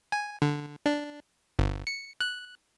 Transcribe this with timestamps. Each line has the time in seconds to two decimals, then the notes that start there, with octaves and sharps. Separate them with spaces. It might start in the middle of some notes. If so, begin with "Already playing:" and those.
0.12 G#5
0.42 D3
0.86 D4
1.59 G1
1.87 C#7
2.21 F#6